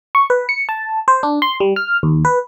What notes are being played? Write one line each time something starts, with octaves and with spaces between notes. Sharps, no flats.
C#6
B4
C#7
A5
C5
D4
C6
G3
F6
D#2
B4